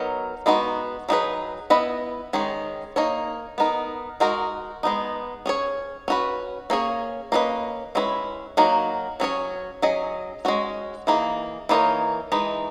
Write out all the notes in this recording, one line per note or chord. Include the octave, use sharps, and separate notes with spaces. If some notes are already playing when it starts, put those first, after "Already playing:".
Already playing: F#3 B3 D#4 A#4 C#5
G#3 B3 D#4 F#4 B4
F#3 B3 D#4 G#4 B4
B3 E4 B4 D#5
D#3 G#3 C#4 G#4
A#3 D#4 A#4 C#5
B3 D#4 A#4
G#3 D#4 F#4 A#4
G#3 B3 D#4
C#4 G#4 C#5
C#4 F#4 B4
A#3 C#4 G#4 C#5
A#3 C#4 F#4 B4 D#5
G#3 C#4 E4 G#4 B4
F#3 A#3 D#4 F#4 A#4
F#3 C#4 G#4 C#5
F#3 C#4 G#4 D#5
G#3 C#4 F#4
E3 A#3 D#4 G#4
E3 A#3 D#4 A#4 C#5
E3 G#3 D#4